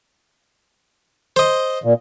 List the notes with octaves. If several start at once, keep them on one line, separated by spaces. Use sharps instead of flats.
C5 D#5
A#2